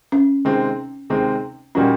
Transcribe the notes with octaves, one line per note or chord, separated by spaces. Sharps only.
C#4
C3 D#3 G#3 C4
C3 D#3 G#3 C4
A#2 G3 A#3 C#4 D#4 F#4